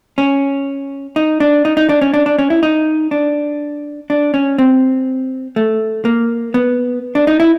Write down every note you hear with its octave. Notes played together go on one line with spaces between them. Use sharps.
C#4
D#4
D4
D#4
D#4
D4
C#4
D4
D4
C#4
E4
D#4
D4
D4
C#4
C4
A3
A#3
B3
D4
D#4
E4